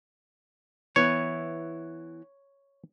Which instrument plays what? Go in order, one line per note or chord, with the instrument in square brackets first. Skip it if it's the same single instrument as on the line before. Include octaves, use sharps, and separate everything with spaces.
[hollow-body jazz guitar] E3 B3 E4 [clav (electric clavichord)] C#5